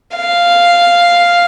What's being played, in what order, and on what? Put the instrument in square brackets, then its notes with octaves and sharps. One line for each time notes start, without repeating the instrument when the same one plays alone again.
[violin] F5